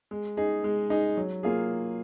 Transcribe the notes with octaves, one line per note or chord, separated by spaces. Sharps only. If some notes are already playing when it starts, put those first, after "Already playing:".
G#3
D#4 G#4
G#3
D#4 G#4
F#3
A#3 F4 G#4